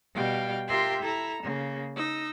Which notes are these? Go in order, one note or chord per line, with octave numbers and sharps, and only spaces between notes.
B2 G3 F5 G5
F4 G4 A#4 E5 G5 C6
E4 A4 A#5
C#3 A#3
D#4 E6 A#6